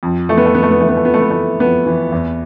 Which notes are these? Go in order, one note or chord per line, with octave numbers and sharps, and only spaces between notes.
F2
E3 A3
B3
A3
F2 B3
A3
B3
E3 A3
B3
A3
F2 B3
A3
B3
E3 A3
F2 B3
E3
E2